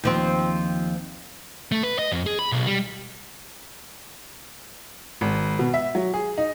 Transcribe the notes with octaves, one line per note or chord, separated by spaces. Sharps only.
D#2 F3 C4
A3
B4
D#5
F2
G#4
B5
B1
G3
G#1
B2
E5
F#3
G#4
D#4